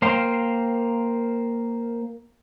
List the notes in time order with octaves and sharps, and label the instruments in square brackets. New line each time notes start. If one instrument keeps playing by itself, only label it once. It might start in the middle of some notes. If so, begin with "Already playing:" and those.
[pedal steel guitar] A#3 C5 F5 G5